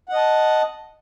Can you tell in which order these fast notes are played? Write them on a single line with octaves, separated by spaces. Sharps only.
F#5 D#5 A5